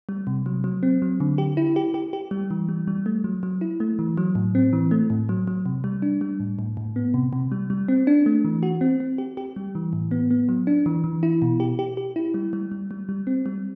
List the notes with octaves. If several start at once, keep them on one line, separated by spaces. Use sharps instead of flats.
G3
C3
F#3
F#3
C4
F#3
D3
G4
E4
G4
G4
G4
G3
E3
G3
G3
A3
F#3
F#3
E4
A3
E3
F#3
A2
C4
E3
A3
A2
F#3
F#3
C3
G3
D4
G3
A2
A2
A2
B3
C3
C3
G3
G3
C4
D4
A3
E3
F#4
C4
C4
G4
G4
G3
E3
A2
B3
B3
F#3
D4
E3
E3
E4
B2
G4
G4
G4
E4
G3
G3
G3
G3
G3
C4
G3